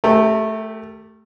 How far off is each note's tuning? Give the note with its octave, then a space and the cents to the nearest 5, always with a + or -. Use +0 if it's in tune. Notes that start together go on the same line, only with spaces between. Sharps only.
A3 -10 G4 +0 A#4 -45